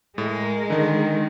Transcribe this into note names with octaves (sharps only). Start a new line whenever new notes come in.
A2 G#3 A#4
D3 D#3 D#4